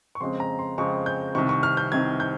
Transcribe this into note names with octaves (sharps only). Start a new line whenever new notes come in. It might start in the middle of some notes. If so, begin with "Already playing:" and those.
C#6
F2 C#3 G#3 C4 C6
A#5
C6
F2 C#3 G#3 C4 C#6
G6
C2 C3 D#3 C#6
C#6
F6
G6
C2 C3 D#3 G#6
G6